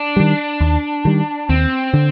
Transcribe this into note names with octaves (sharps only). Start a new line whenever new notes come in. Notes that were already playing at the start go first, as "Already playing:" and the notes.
Already playing: D4
D#3 G3
D#2
D#3 G3
D#2 C4
D3